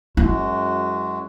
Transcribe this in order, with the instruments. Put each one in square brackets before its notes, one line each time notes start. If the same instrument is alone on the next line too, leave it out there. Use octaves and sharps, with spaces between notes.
[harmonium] F#2 G#3 F#4 [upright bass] E4